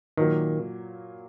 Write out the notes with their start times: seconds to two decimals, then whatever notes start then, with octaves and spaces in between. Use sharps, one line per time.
0.17 A#2 D#3 F#3 A#3